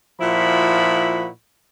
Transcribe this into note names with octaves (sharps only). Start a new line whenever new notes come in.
A#2 F3 E4 F#4 B5